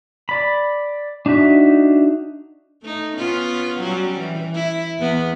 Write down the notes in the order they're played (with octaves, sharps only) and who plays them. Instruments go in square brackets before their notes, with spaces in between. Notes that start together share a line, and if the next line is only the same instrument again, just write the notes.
[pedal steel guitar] D5 B5
D4 D#4 F#4 E5
[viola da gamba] A3 D#4
B3 C#4 F4
F#3 G3 C#4
E3
E4
E2 B3